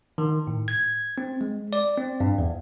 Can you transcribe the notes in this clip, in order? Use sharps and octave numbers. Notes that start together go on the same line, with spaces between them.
D#3
A2
G#6
C4
G#3
D5
C4
G2
E2